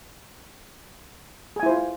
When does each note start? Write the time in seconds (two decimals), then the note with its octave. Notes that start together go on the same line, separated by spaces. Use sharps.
1.56 G#4
1.60 G#5
1.63 E4
1.66 C5
1.69 F4